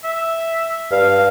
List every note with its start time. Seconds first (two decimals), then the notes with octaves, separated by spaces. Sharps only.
0.04 E5
0.92 G2 F5